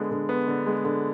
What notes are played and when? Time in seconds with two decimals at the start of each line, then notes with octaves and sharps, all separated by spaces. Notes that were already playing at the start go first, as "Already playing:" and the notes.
Already playing: D3 G#3 B3
0.11 D3
0.29 B3
0.48 D3
0.67 G#3
0.85 D3